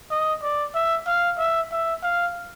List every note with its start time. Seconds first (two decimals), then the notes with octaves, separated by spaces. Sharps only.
0.11 D#5
0.42 D5
0.75 E5
1.07 F5
1.38 E5
1.72 E5
2.03 F5